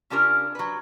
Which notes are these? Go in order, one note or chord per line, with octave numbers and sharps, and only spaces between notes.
C#3 C#4 D4 F4 G4 A#4
F#3 B4